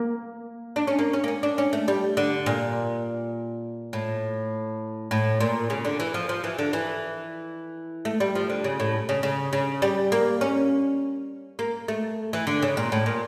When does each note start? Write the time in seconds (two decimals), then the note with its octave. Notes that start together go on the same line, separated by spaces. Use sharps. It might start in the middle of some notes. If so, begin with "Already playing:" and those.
Already playing: A#3
0.76 D4
0.87 C#4
0.99 A#3
1.13 C#4
1.24 A#3
1.28 C#4
1.43 D4
1.58 C#4
1.73 A3
1.88 G3
2.17 D3
2.46 A#2
3.93 A2
5.11 A2
5.40 A#2
5.70 C#3
5.85 D3
6.00 E3
6.14 F3
6.29 F3
6.44 E3
6.59 D3
6.73 E3
8.05 A3
8.20 G3
8.35 F3
8.50 D3
8.64 C#3
8.80 A2
9.09 C#3
9.23 C#3
9.53 C#3
9.82 G3
10.12 A#3
10.41 C#4
11.59 A#3
11.88 A3
12.33 E3
12.47 D3
12.62 C#3
12.77 A#2
12.92 A2
13.06 A#2